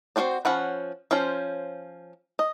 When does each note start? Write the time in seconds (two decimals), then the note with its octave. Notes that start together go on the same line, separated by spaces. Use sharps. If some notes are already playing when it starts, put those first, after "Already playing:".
0.16 C4 C#4 F#4 C5 D5
0.45 F3 C#4 F#5 B5
1.11 F3 C#4 F4 C5
2.39 D#5